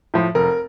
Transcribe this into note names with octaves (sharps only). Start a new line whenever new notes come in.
A2 F3
F1 A#4